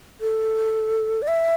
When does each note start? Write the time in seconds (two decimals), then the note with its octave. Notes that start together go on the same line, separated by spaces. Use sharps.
0.21 A4
1.22 D5
1.28 E5